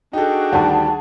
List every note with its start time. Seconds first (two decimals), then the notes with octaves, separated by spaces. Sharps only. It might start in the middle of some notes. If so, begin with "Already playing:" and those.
0.13 D4 D#4 F#4 G#4 A4 G5
0.52 D2 D#3 G3 F#5 A5